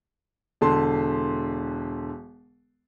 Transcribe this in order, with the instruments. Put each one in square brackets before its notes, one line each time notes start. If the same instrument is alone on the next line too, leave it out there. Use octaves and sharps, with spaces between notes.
[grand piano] E1 D3 A5 C6